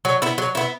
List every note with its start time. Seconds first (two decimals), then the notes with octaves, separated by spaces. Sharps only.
0.05 F#3
0.22 B3 E4
0.38 F#3
0.55 B3 E4